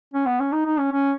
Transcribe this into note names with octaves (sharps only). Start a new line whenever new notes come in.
C#4
B3
C#4
D#4
D#4
C#4
C#4